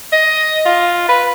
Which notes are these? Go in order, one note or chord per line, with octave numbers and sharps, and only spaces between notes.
D#5
F4
B4